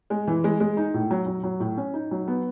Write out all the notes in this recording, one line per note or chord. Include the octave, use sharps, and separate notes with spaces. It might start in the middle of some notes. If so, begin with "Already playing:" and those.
G#3
E3
G#3
G#3
D#4
A2
F#3
F#3
F#3
A2
C#4
D#4
F#3
B3